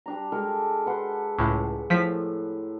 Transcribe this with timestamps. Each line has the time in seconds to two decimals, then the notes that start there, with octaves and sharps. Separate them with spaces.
0.06 G3 D4 A#5
0.32 G#3 A4 A#4
0.86 B4 F#5 C6
1.39 C#2 A2
1.90 A2 F3 B6